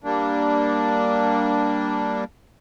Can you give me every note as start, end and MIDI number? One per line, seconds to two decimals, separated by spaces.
0.04 2.24 55
0.04 2.24 58
0.04 2.24 62